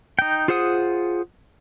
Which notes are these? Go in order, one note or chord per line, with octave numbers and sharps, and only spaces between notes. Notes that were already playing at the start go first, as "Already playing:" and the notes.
D#4 G5
F4 G#4 C5 F#5 D#6